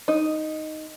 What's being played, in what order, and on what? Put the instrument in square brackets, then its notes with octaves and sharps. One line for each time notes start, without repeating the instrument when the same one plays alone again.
[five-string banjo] D#4